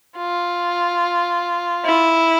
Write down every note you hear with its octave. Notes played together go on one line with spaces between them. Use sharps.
F4
E4